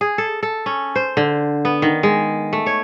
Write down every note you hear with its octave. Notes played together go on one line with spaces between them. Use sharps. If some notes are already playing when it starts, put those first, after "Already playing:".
G#4
A4
A4
C#4
C5
D3
B3
D#3
G#3
A3
C#5